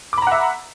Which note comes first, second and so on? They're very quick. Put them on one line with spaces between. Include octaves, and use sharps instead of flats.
D6 B5 A#5 F#5 E5